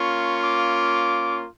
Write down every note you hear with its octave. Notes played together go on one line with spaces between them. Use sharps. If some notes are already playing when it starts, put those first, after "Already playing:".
Already playing: A#3 C#4 F4 C#6
D6